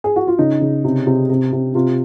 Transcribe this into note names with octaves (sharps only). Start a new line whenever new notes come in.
G#4
F#4
F4
C#3 D#4
C#3
C3
C3
C3
C3
C3 F4